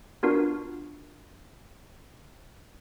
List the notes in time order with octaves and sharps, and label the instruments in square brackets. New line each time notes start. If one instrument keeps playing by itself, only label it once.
[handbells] B3 D4 F4 F#4 A#4